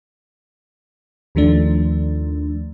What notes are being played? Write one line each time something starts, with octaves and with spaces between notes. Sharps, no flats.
D#2 D#3 F3 A3 D4